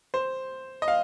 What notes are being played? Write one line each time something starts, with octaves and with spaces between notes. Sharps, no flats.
C5
D#5
F5